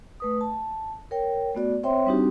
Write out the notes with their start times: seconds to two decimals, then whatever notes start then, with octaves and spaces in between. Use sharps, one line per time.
0.20 A3 B4 D#6
0.41 A5
1.11 A#4 C#5 G5
1.55 A3 B3 F#4 D5
1.83 C4 C5 C#5 E5 G5 C6
2.06 G3 C4 D4 D#4 F#4 G4